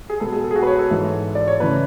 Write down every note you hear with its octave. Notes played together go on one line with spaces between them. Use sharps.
G#4
B2 G#3 B3 A4
G#4
A4
G#4
F#4
B4
C#5
A4
G#2 E3 G#3
D5
C#5
C#3 E3 A3 B4